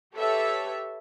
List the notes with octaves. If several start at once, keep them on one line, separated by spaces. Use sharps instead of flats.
G4 A4 B4 C#5 E5